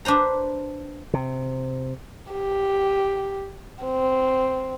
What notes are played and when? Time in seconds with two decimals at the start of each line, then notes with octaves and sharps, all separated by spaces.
0.05 D4 B4 C5 A#5
1.14 C3
2.32 G4
3.84 C4